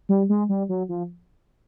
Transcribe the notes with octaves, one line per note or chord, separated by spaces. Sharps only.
G3
G#3
G3
F#3
F3